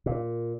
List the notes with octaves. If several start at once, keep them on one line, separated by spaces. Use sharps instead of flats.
A#2